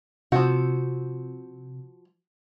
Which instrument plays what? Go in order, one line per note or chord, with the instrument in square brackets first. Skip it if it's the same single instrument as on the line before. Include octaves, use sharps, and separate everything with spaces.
[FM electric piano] C3 [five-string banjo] F3 F#4